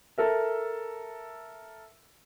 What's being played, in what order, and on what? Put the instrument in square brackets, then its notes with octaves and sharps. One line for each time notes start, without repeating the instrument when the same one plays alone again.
[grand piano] A4 A#4 E5